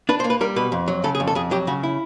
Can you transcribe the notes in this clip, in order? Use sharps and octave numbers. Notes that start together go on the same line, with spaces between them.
D4 B4
C5
A#3
B4
G3 A#4
B2 B4
F2
F#3
C#3 A4
G#4
F2
A4
F2 G#4
F#3 G4
C#3 F#4
E4